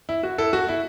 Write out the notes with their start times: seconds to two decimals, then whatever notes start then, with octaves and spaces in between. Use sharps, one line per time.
0.09 E4
0.23 F#4
0.38 E4 A4
0.53 F#4
0.69 E4